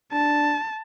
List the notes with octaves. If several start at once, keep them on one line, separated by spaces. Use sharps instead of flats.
D4 A5